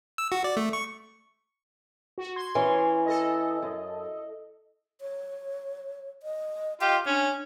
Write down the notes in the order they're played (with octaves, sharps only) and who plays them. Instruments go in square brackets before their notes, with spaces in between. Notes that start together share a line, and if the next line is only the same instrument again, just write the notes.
[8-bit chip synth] E6
F#4
D5
A3
C#6
[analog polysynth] F#4
C6 G#6
[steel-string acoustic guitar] E3 C#4
[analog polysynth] A4 D#5
[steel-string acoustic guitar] F#2
[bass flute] C#5
D#5
[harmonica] F4 G4 [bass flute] D#5
[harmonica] C#4 [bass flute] D4